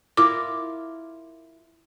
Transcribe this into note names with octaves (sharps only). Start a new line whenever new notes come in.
E4 F4 A#4 D6